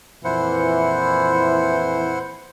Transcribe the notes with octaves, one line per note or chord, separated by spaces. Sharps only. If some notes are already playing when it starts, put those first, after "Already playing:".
F2 A#2 E3 E4 C5 F#5